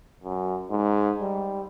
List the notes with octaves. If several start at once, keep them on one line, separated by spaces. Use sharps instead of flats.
F#2
G#2
G3